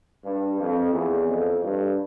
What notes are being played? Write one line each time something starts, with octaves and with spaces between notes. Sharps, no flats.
G2
F2
E2
F2
G2